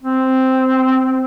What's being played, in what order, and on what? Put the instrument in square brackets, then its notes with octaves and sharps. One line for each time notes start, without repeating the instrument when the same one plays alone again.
[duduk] C4